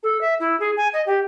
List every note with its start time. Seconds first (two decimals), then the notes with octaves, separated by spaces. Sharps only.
0.03 A4
0.20 E5
0.39 E4
0.59 G#4
0.77 G#5
0.93 D#5
1.06 G4